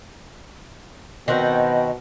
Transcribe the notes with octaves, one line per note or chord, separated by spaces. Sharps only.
B2 D#3 C4 F#4